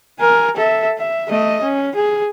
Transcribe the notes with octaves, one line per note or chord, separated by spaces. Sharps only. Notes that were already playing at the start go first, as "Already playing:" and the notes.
A#4 G#5
A4 E5
E5
A3 D#5
C#4
G#4